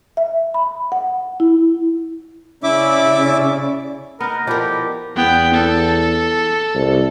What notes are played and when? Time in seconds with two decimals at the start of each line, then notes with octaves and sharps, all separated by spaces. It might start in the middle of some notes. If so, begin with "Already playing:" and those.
0.17 E5
0.54 B5
0.92 F#5
1.40 E4
2.64 C#3 C#4 E4 D5 E5 D6
4.20 B3 D#4 A#4
4.47 F3 E4 G4 A#4 D5
5.16 E2 B3 G5
5.54 A4
6.75 C2